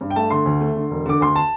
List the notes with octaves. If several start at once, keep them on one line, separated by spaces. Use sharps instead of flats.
G2
G5
A3 A5
D3 C6
D2
A3
D3
E1
D3 D6
D2 C6
A5